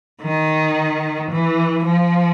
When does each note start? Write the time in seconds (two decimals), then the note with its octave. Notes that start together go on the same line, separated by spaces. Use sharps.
0.22 D#3
1.31 E3
1.85 F3